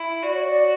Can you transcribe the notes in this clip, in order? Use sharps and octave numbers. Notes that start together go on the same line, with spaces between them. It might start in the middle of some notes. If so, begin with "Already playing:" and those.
Already playing: E4
F#4 D5
C#5
D5